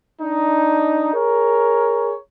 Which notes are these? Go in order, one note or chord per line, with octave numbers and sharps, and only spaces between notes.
D4 D#4
G#4 A#4 C#5